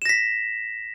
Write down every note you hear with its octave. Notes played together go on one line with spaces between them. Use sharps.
A#6 B6 E7